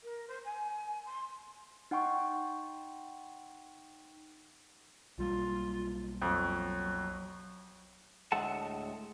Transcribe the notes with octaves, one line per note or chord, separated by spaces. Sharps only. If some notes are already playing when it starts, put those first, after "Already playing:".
A#4
C5
G#5
C6
D#4 F#5 G5 C6 C#6
B1 G3 A#3 F4
F2 F#3
D2 A2 G#3 E5 F#5 A5